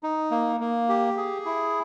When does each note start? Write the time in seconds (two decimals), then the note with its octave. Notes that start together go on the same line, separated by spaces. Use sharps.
0.03 D#4
0.31 A#3
0.60 A#3
0.89 G4
1.17 G#4
1.45 E4